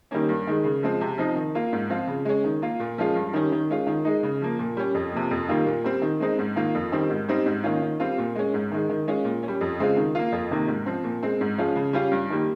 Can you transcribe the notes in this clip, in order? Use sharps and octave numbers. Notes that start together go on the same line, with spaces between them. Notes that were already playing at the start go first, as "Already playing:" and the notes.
D#3 G3 A#3 C#4
G2
D#3 G#3
C#3
F3 G#3 C4
C3
F3 C4 D#4
D#3
A#3 F4
G#2
F3 C4 F4
C#3
G#3 C#4
D#3
A#3 F4
A#2
F3 G#3 C#4 F4
G2
D#3 G3 C#4
D#3
G#3 C#4 F4
D#3
G#3 D#4
C#3
F3 A#3
A#2
G3 C#4
F2
C3 F3 A#3
F2
D#3 G3 A#3 F4
A#2
G3 C4
D#3
G#3 C4 D#4
G#2
D#3 A#3 F4
F2
D#3 G3 C4
G#2
G3 C4 D#4
G#2
D#3 A#3 C#4 F4
D#3
G3 C4 F4
A#2
G#3 C#4
G#2
D#3 G#3
D#3
G#3 C#4 F4
A#2
C#4
G3
F2
C#3 G#3 C4 F4
D#3
A#3 F4
F2
C3 D#3 A#3
G#2
F3 C4
A#2
G#3 C4
G#2
F3 G#3 C#4 F4
C#3
G3 C#4 F4
G2
D#3 G3 A#3